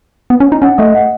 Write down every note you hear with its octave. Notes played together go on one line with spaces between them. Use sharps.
B3
C#4
D#4
C#4 F#5
A3 D#5
F#5